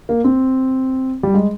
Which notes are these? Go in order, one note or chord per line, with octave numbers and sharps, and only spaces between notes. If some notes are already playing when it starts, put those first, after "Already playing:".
A#3
C4
G3
G#3